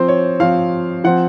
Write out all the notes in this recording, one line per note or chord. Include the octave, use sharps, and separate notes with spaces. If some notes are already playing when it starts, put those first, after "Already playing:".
Already playing: F3 C4 C5
C#5
F3 C4 F5
F3 C4 F#5